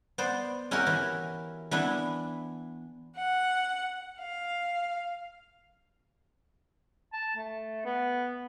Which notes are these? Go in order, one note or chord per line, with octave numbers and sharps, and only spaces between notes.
B3 C5 D5
C#4 E4 F#4 G4 A#4
E3
E3 B3 D4 E4
F#5
F5
A5
A3
B3